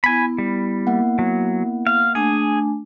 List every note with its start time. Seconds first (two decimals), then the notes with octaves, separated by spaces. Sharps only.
0.04 B3 E4 G#5 B5
0.38 G3
0.87 A#3 F#5
1.19 F#3
1.87 F5
2.15 A3 D4 G#4 G#5